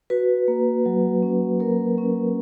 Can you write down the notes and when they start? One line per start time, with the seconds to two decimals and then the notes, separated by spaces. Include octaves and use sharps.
0.10 F#4 B4
0.48 A#3
0.86 F#3
1.23 C#4
1.60 A#3 A#4
1.98 C#4